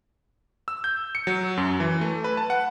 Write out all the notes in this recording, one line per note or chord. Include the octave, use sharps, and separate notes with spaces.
E6
G6
C#7
F#3
F#2
E3
A3
B4
A5
F#5